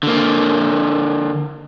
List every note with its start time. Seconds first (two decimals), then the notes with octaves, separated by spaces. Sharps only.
0.03 D3 A#3